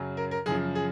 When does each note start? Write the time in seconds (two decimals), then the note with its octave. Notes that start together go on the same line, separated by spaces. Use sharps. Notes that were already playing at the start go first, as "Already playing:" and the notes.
Already playing: F#2 C#3 F#3
0.17 A#4
0.31 A#4
0.46 F#2 C#3 F3 G#4
0.75 G#4